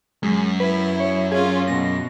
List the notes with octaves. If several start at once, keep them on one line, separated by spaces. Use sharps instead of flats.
F#2 G#3
E4 B4
C#5
C#4 F4 G#4
B2 A#6